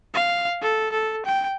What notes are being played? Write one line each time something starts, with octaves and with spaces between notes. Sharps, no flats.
F5
A4
A4
G5